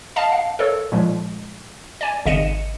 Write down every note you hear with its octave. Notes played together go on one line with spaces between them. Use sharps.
D#5 F5 A5
F5
A4 A#4 C#5
A#2 F3 G#3
D5 G#5
G#1 C#3 D#5 C#7 D#7 E7